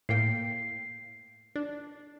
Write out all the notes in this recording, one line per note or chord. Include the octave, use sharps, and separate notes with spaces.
A2 A#3 G5 C7
D4